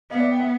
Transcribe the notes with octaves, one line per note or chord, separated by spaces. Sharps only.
B3 D#5 F5
D5 E5
G5
E5 F#5